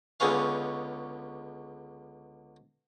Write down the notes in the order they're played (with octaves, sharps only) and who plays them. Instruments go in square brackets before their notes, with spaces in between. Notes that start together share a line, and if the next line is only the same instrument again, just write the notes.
[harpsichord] C#2 D3 G#3 B3 C#4 F5